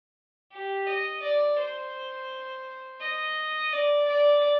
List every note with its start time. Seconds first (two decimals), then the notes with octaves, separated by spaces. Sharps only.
0.52 G4
0.87 D#5
1.22 D5
1.59 C5
3.00 D#5
3.72 D5
4.08 D5